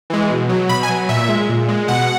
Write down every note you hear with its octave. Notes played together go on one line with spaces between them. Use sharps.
E3 G#3
B2
F#3
B2 B5
G#5
F#3
A#2 E5
G#3
A#2
G#3
B2 F#5